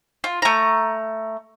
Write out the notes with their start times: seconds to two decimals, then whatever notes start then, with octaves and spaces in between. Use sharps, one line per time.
0.24 F4
0.42 A3 A#5